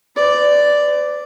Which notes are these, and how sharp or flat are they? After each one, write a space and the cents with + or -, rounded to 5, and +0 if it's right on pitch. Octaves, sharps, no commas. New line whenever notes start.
B4 +45 D5 +0